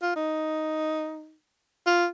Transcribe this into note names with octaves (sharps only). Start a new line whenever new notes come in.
F4
D#4
F4